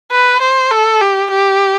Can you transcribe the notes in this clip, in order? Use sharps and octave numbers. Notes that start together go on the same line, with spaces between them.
B4
C5
A4
G4
G4